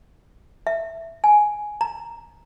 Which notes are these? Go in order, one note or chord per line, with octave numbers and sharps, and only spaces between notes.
E5
G#5
A#5